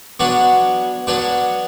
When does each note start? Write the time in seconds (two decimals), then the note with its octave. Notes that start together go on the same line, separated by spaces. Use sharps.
0.20 F#3 B3 D4 F#4 B4
1.07 F#3 B3 D4 F#4 B4